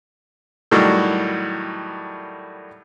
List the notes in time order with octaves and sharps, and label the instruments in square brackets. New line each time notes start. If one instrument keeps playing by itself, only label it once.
[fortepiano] A2 D#3 F#3 G3